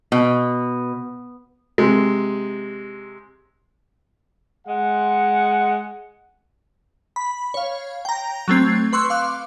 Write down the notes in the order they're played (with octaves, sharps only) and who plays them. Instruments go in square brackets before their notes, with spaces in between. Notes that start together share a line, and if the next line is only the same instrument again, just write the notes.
[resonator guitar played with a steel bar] B2
[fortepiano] C3 G#3
[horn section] G#3 F#5
[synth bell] B5
C#5 F5
G5 A#5
F#3 A3 C4 G#6
B4 C6 C#6 E6 F#6
F5 D6 F#6